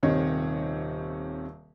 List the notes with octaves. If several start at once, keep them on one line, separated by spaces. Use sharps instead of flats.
D#1 C3 D#3 C#5 D#5